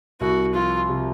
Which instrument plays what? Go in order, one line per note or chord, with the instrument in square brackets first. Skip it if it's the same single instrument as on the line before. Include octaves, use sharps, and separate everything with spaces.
[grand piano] C2 [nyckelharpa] F#4
[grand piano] F3 [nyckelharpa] F4
[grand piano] C3